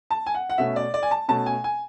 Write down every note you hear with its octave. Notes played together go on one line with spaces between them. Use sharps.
A5
G#5
F#5
F#5
B2 A3 C#4 E5
D5
D5
G#5
A5
B2 A3 C#4 A5
G#5
G#5